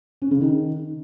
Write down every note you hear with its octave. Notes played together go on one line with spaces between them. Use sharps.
C#4
C#3
D#3